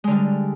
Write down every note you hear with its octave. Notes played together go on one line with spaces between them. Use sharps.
D3 G3 G#3